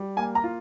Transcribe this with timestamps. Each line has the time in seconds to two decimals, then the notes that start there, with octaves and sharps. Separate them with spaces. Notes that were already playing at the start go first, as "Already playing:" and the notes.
Already playing: G3
0.17 A#3 G#5
0.35 A#5
0.44 F4